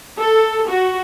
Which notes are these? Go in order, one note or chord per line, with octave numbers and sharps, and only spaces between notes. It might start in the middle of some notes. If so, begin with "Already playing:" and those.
A4
F#4